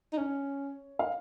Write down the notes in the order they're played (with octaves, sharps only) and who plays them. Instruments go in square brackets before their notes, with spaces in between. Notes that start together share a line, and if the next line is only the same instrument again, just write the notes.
[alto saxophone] D#4
[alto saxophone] C#4 [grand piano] C#5
[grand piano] F5